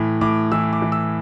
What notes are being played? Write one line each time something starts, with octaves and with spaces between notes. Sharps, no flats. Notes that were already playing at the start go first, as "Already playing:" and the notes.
Already playing: A2 E3
A2 D6
E3 E6
D6
E3
E6